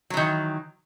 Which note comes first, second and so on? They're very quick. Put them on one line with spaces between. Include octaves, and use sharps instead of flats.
F#3 E3 D#3